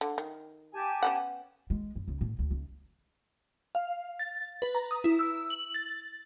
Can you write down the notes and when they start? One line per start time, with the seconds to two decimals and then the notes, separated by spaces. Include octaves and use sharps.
0.01 D3
0.18 D#3
0.72 G4 G#5 A5
1.03 B3 C#4 F#5
1.70 G#3
1.96 F#2
2.08 C#2
2.21 A2
2.39 D2
2.51 C#2
3.75 F5
4.19 A6
4.62 B4
4.75 A#5
4.91 D#6
5.04 E4
5.19 E6
5.50 F#7
5.74 A6